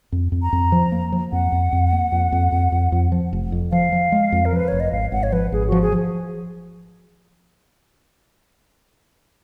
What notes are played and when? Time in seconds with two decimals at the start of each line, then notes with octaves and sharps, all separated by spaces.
0.12 F2
0.32 F2
0.43 A#5
0.53 F2
0.72 F3
0.92 A#3
1.12 F3
1.32 F2 F#5
1.52 F2
1.72 F2
1.93 A#3
2.12 F2
2.32 F2
2.52 F2
2.72 F2
2.92 F2
3.12 F3
3.33 F1
3.52 F2
3.72 F3 F5
3.92 F3
4.12 G#3
4.32 F2
4.45 A#4
4.52 F3 B4
4.68 F1 C#5
4.80 D#5
4.92 G#1 F5
5.12 G#1 F#5
5.23 C#5
5.32 F3 B4
5.52 G#1 G#4
5.68 F3 F#4
5.82 G#4
5.92 F3